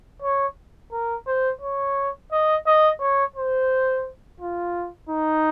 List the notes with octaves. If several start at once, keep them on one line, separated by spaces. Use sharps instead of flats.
C#5
A#4
C5
C#5
D#5
D#5
C#5
C5
F4
D#4